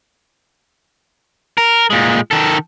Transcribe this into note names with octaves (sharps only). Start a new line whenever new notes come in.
A#4
A#2 G#3
D#3 A4